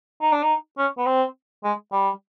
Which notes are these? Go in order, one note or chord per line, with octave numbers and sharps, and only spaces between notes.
D#4
D4
D#4
C#4
B3
C4
G#3
G3